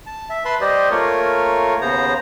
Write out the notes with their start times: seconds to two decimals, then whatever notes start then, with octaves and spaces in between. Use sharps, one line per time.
0.06 A5
0.30 E5
0.45 B4 A5 B5 C6
0.61 G3 G4 C5 D5 D#5
0.91 A3 A#3 F4 A#4 C#5
1.81 D#2 C#3 B3 C5 A#5